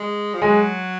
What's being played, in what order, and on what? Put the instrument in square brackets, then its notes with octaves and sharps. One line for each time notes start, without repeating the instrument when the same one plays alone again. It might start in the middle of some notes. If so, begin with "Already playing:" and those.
Already playing: [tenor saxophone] G#3
F3
[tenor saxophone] F#3 [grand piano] G#3